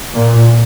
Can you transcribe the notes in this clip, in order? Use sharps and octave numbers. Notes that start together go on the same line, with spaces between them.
A#2